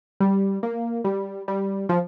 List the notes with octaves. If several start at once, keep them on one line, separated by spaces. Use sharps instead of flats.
G3
A#3
G3
G3
F3